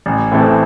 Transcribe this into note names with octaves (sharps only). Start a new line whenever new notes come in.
A1
A2 E3 C4 A4